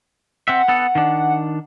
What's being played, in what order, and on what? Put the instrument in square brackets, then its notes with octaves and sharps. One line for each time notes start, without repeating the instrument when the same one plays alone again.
[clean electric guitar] C4 E5 [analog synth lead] F#5
[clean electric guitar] B3 A4
D#3 D4